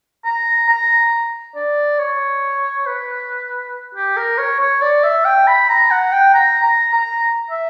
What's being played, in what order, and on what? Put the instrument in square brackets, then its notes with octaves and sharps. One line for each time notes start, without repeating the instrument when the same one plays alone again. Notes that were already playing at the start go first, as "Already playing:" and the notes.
[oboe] A#5
A#5
D5
C#5
B4
G4
A#4
C#5
C#5
D5
E5
G5
B5
A#5
F#5
G5
A#5
A#5
A#5
E5